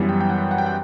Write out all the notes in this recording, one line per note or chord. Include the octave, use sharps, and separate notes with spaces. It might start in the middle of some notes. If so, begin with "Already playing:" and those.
Already playing: F#2 E3 G3 B3
G5
G5
F#5
F#5
G5
F#5